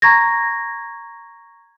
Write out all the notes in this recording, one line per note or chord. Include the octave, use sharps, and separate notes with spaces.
A#5 C#6 G#6 A#6